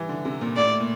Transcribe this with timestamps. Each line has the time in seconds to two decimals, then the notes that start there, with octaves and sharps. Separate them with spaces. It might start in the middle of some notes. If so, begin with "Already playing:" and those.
Already playing: E3 G3
0.09 D3
0.25 C3
0.41 A#2
0.56 A2 D5
0.80 A#2